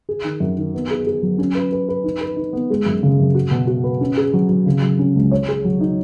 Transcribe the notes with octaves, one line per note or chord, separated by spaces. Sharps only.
G#4
D#3
F#2
D#3
B3
G#4
G#4
F#3
C#4
B4
B4
B4
D#4
B4
D#4
B3
G#3
F#2
C#3
F#2
F#4
B2
F#4
B4
C#4
G#4
F#3
F#3
C#3
F#3
C#4
C#2
C#5
G#4
F#3
D#4